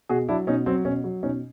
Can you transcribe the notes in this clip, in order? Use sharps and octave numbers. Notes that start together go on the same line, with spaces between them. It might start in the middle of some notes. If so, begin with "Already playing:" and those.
B2 F#4 G#4
F#3 D4 E4
B2 C#4 D#4
F#3 C4
B2 C#4
F#3
B2 C#4 D#4